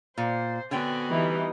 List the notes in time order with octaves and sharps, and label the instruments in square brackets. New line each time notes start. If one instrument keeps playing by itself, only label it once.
[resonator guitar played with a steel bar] A#2 [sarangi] C5
[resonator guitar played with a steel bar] D3 C#5 G5 [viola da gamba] B3 C4 F#4 [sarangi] G#5
[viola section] E3 G3 [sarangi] D#4